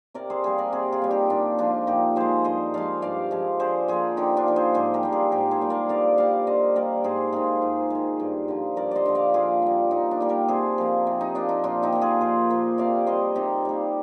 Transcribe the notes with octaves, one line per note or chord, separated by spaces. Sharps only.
C3 A#4 D5
G#4 C5
G3 A#3 G#4 C5
A#4 D5
C3 G#4 C5
F4 G#4
G3 A#3
D#4 G4
A#2 D4 F4
F3 G#3 D4 F4
A#2 D#4 G4
F3 G#3 G#4 C5
G2 C5 D#5
F3 G#3 D5 F5
G2 D5 F5
F3 G#3
D3 G#4 C5
F3 A#3 F4 G#4
D3 D#4 G4
D4 F4
F3 A#3
G#4 C5
G#2 G#4 C5
G4 A#4
G3 A#3
F4 G#4
G#2 G4 A#4
G#4 C5
G3 A#3
A#4 D5
D3 D5 F5
G3 A#3 D5 F5
D3 C5 D#5
G3 A#3 A#4 D5
G#2 G#4 C5
D#3 G#3 F4 G#4
G#2
D#3 G#3
G2
D3 F3
G2 A#4 D5
C5 D5 D#5
D3 F3
D5 F5
A#2 F4 G#4
G3 A#3
A#2 D#4
D4
G3 A#3
G4 A#4
C3 G#4 C5
F3 A#3
C3
D#4
F3 A#3 D4
D#4
A#2 D4 F4
D#4 G4
F3 A#3
F4 G#4
A#2 G#4 C5
F3 A#3
C3 D5 F5
G3 A#3 C5 D#5
C3 D#4 G4
G3 A#3